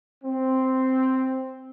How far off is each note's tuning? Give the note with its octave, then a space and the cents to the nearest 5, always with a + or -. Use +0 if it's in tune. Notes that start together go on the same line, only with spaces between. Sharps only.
C4 +0